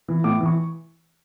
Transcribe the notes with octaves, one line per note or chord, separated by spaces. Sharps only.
E3
A2 D6
E3 C#6